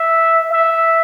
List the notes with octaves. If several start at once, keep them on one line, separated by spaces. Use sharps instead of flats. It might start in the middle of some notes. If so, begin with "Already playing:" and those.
Already playing: E5
E5